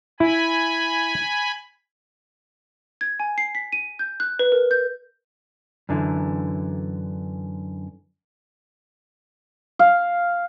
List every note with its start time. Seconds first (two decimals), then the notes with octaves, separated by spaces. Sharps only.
0.20 E4 G#5 B5
3.01 G#6
3.20 G#5
3.38 C7
3.55 B6
3.72 D#7
3.99 G6
4.20 F#6
4.39 B4
4.52 A#4
4.71 G6
5.89 F#2 D3 E3
9.79 F5